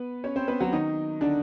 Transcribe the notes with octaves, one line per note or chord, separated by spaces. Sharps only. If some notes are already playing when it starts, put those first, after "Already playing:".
Already playing: B3 B4
C#4 C#5
C4 C5
B3 B4
F#3 F#4
D#3 D#4
D3 D4